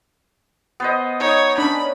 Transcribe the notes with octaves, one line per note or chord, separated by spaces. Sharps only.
B3 C5 D#5
D#4 C#5
C#4 D4 B5